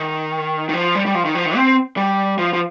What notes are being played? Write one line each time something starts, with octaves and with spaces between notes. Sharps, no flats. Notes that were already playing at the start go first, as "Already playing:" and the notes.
Already playing: D#3
D#3
F3
G3
G3
F3
D#3
F3
D#3
C4
G3
F3
F3